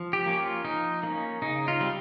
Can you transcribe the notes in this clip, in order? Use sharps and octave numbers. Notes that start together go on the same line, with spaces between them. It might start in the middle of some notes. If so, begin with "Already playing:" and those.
Already playing: F3
G4
A#3 C#4
F4
F3 D#4
A#3 C#4
C#3 D#4
F4
G3 C4